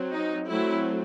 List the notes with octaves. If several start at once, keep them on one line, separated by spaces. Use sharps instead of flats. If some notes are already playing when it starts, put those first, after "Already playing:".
Already playing: F#3 C4
D#4
F#3 A3 C4 E4